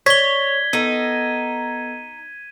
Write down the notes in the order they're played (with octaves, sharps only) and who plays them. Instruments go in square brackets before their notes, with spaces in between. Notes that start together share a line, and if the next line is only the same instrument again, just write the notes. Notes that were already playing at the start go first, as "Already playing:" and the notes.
[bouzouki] C#5 [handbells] D5 [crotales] G#6 [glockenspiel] B6 G7
[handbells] B3 A4 [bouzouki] D#4 [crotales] D#7